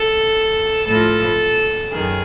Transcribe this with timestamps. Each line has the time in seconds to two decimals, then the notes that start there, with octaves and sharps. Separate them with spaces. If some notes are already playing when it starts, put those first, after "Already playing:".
Already playing: A4
0.87 A2 F3 A4
1.91 F#2 D#3 G#4